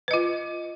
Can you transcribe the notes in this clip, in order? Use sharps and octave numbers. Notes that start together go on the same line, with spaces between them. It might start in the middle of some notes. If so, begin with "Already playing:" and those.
F4 B4 D#5